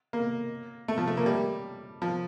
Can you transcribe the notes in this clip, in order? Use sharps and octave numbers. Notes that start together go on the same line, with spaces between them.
A#3
A3
F3
A3
A#3
G3
F3